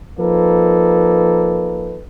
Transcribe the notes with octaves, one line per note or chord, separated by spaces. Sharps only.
F3 A#3 D#4 A4 B4